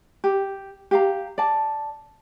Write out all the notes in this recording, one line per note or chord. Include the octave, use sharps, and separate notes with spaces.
G4
G4 F5 A#5
D5 A5